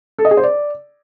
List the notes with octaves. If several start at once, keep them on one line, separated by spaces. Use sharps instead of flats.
A4
D#5
G#4
C5
D5